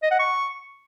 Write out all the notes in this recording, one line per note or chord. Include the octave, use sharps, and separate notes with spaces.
D#5
F#5
C#6